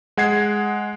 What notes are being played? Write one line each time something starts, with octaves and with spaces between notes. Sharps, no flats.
G#3 F#5 G#6 C7